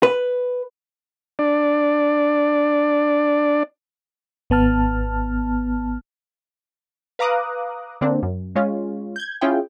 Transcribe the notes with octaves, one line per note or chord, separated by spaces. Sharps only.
B4
D4 D5
G#1 B3 A5 F6
B4 F5 A#5 D6 D#6 F#6
D3 A#3 C4 D4
F#2
G#3 C#4 F4
G6 G#6
C#4 E4 F4 G#4 G5